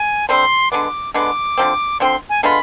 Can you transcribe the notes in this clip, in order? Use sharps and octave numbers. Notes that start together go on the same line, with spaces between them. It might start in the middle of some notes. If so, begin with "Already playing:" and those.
Already playing: G#5
D3 G3 C4 C6
D3 G#3 B3 D6
D3 G#3 B3 D6
D3 F3 C4
D3 F3 C4 C6
G#5
D3 G#3 B3 F4 B5